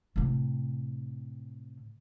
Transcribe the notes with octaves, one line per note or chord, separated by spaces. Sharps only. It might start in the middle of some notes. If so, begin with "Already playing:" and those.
A2 C3